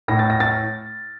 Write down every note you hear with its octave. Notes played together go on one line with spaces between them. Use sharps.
A2 A#6
A6
A#6
A6